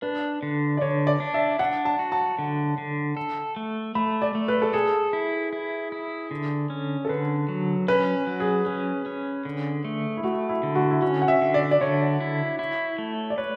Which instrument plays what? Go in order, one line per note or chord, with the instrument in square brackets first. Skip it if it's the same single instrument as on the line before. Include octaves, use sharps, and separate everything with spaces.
[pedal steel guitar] D4 [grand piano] B4
[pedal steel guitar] D3
[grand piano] D5
[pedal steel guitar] D3 [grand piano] C#5
[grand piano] D5
[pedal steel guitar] D4
[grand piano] E5
[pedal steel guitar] D4 [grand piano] F#5
[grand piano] A5
[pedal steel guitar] F#4
[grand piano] A5
[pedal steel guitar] D3
D3
A4
A3
[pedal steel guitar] A3 [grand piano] B5
[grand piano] D5
[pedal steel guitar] A3
[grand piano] B4
A4
[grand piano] G#4 [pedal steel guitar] A4
[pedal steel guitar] E4
E4
E4
D3
C#4
[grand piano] A4
[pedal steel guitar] D3 [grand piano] B4
[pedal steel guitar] F#3
[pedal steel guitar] C#4 [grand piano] B4
[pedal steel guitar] F#3
[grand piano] G#4
[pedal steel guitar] C#4 [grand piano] G#4
[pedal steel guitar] C#4
D3
A3
[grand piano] E4
[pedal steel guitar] A3 [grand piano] F#4
[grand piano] E4
[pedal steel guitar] D3
[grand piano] F#4
E4
[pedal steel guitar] C#4 [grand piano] F#4
[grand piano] F#5
E5
[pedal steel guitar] D3
[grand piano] D5
D5
[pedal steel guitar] D3 [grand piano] C#5
[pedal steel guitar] E4
E4
A3
[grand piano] D5
[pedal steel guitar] B4 [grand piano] C#5